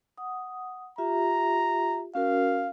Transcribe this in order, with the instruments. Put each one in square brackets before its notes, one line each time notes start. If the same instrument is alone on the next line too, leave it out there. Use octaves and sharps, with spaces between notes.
[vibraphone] F#5 D#6
[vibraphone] F4 G4 E5 [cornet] A#5
[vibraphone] C#4 F#4 A#4 [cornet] F5